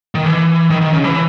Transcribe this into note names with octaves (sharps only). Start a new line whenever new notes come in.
D#3
E3
D#3
D#3
C#3
E3